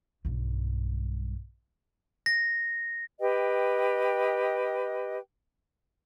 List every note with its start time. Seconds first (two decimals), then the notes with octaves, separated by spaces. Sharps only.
0.25 B1 G2
2.26 A#6
3.20 G4 B4 D#5 G5